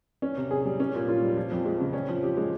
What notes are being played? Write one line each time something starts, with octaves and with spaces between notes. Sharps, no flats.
C#4
C3
G#4
G3
C#4
A#2
F4
G3
F3
F2
G#3
C#3
C#4
F3
G4
G#3